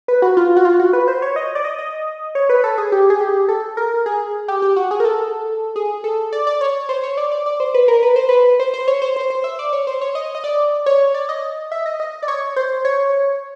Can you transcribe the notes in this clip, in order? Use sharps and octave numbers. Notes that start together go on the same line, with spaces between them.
B4
F#4
F4
F#4
F4
F#4
B4
C5
C#5
D#5
D5
D#5
D#5
C#5
B4
A4
G#4
G4
G#4
G4
A4
A#4
G#4
G4
G4
F#4
G#4
A#4
A4
G#4
A4
D5
D5
C#5
C5
C#5
D5
D5
D5
C5
B4
A#4
B4
C5
B4
C5
C5
C#5
C5
C5
C5
E5
D5
C#5
C5
C#5
D#5
D#5
D5
C#5
D5
D#5
E5
D#5
D#5
D5
C#5
C5
C#5